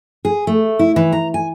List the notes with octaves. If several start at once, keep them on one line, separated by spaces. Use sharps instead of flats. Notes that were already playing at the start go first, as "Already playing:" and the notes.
G#4
A3
E4
E3
A#5
G#5